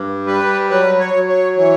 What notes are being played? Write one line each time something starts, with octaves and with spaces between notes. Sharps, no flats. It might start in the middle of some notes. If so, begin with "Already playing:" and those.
Already playing: G2
G3 B4
F#3 B4
C#5
F#3
C#5
E3 C#5